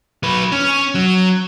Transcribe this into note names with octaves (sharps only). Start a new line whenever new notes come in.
F#3 B4
C#4
F#3